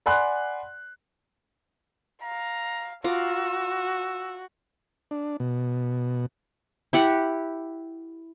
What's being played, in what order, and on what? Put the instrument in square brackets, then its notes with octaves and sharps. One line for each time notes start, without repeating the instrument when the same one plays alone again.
[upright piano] D5 F#5 G#5 B5 C6 F#6
[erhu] F5 [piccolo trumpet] A#5
[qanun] F4 A#5 D6 [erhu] F#4 [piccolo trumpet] E6
[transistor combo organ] D4
B2
[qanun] E4 G4 F#5